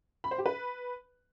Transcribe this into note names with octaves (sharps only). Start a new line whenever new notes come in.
B5
C5
G4
B4